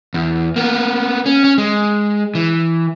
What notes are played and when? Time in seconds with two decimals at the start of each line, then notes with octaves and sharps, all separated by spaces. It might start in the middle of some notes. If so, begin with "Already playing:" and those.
0.14 E2
0.56 A#3 B3
1.26 C#4
1.44 C#4
1.58 G#3
2.35 E3